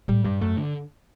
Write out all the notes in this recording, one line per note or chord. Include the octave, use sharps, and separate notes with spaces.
A2 G3
G2 G3
F#2 A3
D3